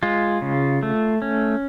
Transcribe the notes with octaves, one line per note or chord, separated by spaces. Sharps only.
G#3 F4
C#3
A3
C#4